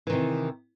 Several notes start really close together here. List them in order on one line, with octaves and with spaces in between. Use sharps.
E3 D#3 C3